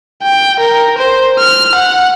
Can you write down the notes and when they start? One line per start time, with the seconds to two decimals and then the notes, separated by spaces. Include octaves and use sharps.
0.23 G5
0.60 A#4
0.98 C5
1.40 F6
1.75 F#5